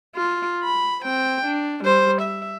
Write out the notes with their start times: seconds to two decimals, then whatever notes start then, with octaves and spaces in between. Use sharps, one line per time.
0.15 F4
0.63 B5
1.03 C4 G5
1.46 D4
1.84 G3 C5
2.21 E5